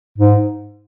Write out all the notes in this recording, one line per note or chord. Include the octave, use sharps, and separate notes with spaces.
G#2